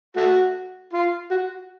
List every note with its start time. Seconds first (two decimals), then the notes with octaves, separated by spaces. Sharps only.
0.16 A3 F#4
0.93 F4
1.31 F#4